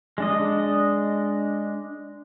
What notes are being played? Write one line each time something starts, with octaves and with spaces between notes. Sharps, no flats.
G#3 D4 D#5